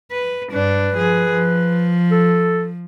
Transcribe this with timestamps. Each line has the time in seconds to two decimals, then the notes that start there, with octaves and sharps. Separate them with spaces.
0.12 B4
0.52 G2 D4 B4
0.95 F3 G#4
1.31 F3
2.11 A4